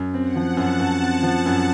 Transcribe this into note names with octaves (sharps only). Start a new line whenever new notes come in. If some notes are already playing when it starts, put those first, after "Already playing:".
Already playing: F#2
C4
F#5
F3
A5
F#2
F#2
C4
F3
F#2